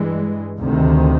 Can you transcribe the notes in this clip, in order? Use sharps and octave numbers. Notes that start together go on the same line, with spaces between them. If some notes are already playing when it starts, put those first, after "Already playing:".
Already playing: G2 E3 G#3
D2 C3 D#3